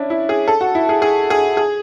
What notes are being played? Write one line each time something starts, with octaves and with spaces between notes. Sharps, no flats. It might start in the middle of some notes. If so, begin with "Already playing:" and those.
Already playing: C#4 D4 E4
E4
G#4
A4
F#4
E4
G#4
G#4
G#4
G#4